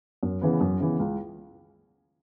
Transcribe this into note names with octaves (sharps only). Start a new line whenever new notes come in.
F#2
C#3 E3 B3
F#2
C#3 E3 B3
C#2